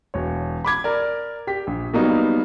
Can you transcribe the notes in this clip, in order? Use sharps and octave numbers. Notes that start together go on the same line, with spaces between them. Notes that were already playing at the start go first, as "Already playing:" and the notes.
E1 C#5
B5 D6 G#6
A#4 D5
G4 B6
A#1
F#3 G3 A#3 B3 D#4